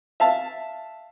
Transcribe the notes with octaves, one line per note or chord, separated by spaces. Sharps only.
E5 F5 A5